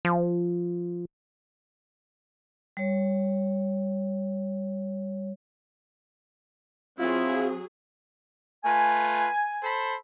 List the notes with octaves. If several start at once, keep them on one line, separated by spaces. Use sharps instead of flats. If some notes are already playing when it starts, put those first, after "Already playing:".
F3
G3 C#5
F#3 C4 E4 F4 G#4
A3 F4 B4 G#5
A4 C5 B5